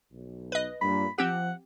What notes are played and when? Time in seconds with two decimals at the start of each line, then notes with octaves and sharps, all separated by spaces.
0.13 B1
0.52 B4 D#5
0.82 G2 A#2 B5
1.18 F3 C4 G4 F#5